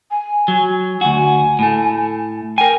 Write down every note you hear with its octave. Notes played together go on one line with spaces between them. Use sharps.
G#5
F#3
D2 F#4 G#5
A2 A3
A#4 G5 G#5